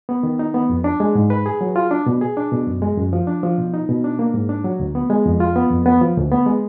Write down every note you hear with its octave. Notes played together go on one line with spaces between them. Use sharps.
B3
D#3
D#4
B3
F2
D4
G#3
G#2
B4
G#4
F#3
F4
D4
B2
G#4
D4
B2
F#2
G#3
F#2
F3
D4
F3
B2
D#4
B2
D4
A#3
G#2
D4
F#3
D2
B3
G#3
F2
F4
B3
F2
B3
F3
D2
B3
G#3